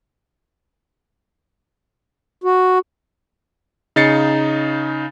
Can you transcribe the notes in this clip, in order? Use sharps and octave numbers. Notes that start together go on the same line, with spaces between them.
F#4
C#3 D#4 A6 C7 C#7